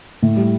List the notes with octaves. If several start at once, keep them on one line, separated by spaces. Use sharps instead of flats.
A2
G3